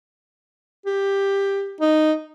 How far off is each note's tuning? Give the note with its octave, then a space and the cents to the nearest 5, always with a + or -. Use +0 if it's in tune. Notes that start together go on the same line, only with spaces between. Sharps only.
G4 +10
D#4 -5